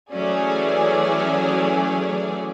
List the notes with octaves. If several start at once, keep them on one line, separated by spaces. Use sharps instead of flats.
E3 F#3 A3 C#4 G#4 D5